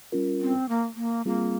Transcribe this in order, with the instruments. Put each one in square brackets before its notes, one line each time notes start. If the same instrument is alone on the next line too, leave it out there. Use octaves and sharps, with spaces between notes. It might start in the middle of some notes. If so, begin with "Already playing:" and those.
[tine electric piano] G3 C#4 F4 A#4
[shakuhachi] C4
A#3
A#3
[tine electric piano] G3 C4 F4 G#4 [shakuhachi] A#3